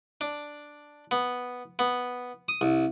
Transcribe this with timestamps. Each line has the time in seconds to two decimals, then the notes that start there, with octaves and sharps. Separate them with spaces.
0.21 D4
1.11 B3
1.79 B3
2.48 D#6
2.61 C2